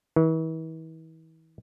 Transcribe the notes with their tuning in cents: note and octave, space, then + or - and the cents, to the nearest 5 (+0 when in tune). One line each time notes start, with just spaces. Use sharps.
E3 -40